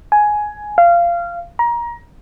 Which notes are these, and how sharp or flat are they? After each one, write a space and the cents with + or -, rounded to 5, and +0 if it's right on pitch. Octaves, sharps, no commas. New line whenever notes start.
G#5 +10
F5 -20
A#5 +25